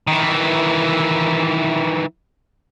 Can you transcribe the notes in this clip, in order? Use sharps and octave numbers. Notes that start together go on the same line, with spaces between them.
D#3 E3